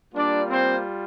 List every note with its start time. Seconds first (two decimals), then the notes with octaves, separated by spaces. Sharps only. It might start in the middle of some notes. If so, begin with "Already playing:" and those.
0.14 G3 A#3 D4 F4 D5
0.50 C4 C5